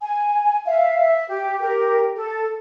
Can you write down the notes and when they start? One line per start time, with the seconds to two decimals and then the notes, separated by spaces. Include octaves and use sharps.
0.02 G#5
0.66 E5 F5
1.00 E5
1.29 G4
1.61 G4 A#4
2.16 A4